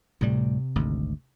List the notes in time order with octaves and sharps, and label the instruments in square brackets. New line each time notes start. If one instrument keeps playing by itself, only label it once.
[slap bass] D2 A2 G3 [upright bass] C3
[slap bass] G#1 D2